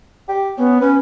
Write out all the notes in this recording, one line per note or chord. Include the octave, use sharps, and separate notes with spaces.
G4
B3 C#4
C#4 B4